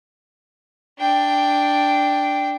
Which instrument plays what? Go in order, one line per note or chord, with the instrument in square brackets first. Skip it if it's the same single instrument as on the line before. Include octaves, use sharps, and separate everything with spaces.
[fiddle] D4 G5